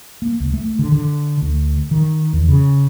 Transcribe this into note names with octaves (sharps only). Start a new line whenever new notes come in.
A#3
C#2
A3
D3
D3
D2
D#3
E2
C#3